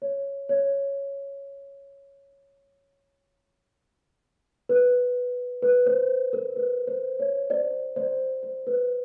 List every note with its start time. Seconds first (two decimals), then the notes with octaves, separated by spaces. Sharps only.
0.02 C#5
0.49 C#5
4.69 B4
5.63 B4
5.86 C5
6.33 A#4
6.56 B4
6.87 C5
7.20 C#5
7.50 C5 D5
7.96 C5 D5
8.43 C5
8.67 B4